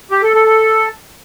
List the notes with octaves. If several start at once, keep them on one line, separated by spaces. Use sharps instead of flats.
G4
A4
A4
A4